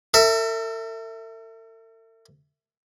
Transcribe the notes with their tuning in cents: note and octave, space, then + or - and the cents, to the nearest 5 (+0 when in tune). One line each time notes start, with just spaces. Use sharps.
A4 +45 E5 +0